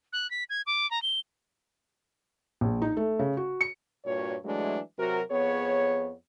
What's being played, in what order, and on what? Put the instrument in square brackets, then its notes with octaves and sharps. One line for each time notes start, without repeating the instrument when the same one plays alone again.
[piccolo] F#6
B6
G#6
D6
A#5
G7
[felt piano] A#1
D#4
A3
C#3
F#4
C#7
[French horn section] G2 A#2 F#4 C#5
E3 F#3 G#3 A3 D4
C3 F#3 F#4 A#4
F2 B3 G#4 C#5